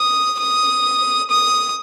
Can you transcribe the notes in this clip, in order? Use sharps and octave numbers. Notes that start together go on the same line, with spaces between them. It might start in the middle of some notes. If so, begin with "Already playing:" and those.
Already playing: D#6
D#6
D#6